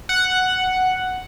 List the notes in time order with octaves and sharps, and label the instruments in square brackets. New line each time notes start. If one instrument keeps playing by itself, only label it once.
[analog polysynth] F#5